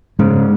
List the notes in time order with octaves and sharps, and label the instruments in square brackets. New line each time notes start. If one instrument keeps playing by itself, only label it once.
[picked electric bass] G#2 C#3 [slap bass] G#3